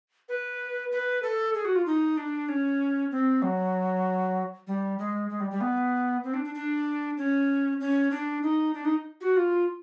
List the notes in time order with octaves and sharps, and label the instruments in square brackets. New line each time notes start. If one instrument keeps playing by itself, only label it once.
[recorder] B4
B4
A4
G#4
F#4
F4
D#4
D4
C#4
C4
F#3
G3
G#3
G#3
G3
G3
B3
C4
D4
D4
D4
C#4
C#4
D4
D#4
D4
D#4
F#4
F4